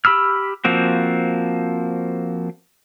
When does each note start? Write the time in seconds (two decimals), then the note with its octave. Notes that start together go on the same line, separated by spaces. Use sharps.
0.05 G4 B5 E6 F6
0.65 F3 A#3 C4 F#4